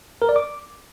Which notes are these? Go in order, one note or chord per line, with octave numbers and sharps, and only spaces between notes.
A#4
D5
D6